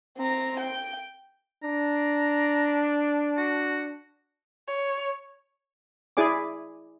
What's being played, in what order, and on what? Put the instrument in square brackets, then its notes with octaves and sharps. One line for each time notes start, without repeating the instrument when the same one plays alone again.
[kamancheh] C4 A#5
G5
[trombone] D4 [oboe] A#5
[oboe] F#4
[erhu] C#5
[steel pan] E4 G#4 D5 G#5 D6